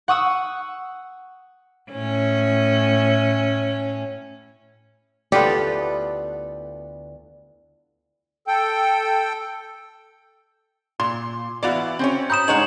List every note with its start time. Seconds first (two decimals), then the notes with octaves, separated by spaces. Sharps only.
0.08 F#5 C#6 D#6 E6
1.92 A2 C#4
5.32 D2 B3 E4 F4 G4 A4 D5
8.47 A4 G5
11.00 A#2 C6
11.63 E3 B3 E4 F#4 D5 F5
11.99 C4 C#4 C#5
12.30 A#5 B5 D#6 G6 E7
12.48 G2 G#3 D#4 G#4 C#5 F#5 A#5 F#7